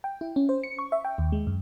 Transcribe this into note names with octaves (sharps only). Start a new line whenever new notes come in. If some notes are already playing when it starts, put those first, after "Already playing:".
G5
E4
C#4
C5
C#7
C#6
E5
G5
D#2
G#3
F#2